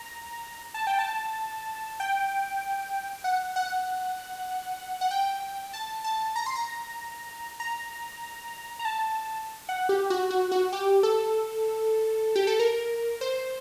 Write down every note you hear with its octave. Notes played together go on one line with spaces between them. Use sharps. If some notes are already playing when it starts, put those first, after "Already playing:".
Already playing: A#5
A5
G5
A5
G5
F#5
F#5
F#5
G5
A5
A5
A#5
C6
A#5
A#5
A#5
A5
F#5
G4
F#4
F#4
F#4
G4
A4
G4
A4
A#4
C5